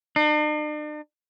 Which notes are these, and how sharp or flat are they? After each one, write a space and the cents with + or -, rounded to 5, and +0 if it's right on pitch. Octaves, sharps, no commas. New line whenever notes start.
D4 +45